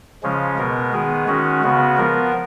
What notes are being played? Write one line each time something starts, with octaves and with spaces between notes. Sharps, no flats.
C#3 F3 G#3 C#4
B2 G#3 B3 A#4
D#3 G#3 B3 G#4
D#3 G#3 C#4 F#4
C#3 G#3 B3
F3 B3 A#4